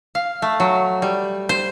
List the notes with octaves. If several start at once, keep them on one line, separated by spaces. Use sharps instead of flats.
F5
A3
F#3
G3
C5